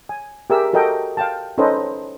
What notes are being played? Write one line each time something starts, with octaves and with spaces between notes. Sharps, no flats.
G#5
G4 G#4 A#4 E5 E6
F#4 A4 A#4 D#5 G5
F5 G5 A5
C#4 D#4 A4 B4 C5 D#5